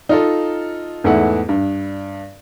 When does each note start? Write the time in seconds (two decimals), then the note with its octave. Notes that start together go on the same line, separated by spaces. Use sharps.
0.09 D#4 F4 A4
1.04 E2 G#2 A3 B3 E4 F#5
1.49 G2